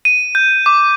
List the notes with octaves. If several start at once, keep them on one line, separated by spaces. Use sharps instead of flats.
D#7
G6
D6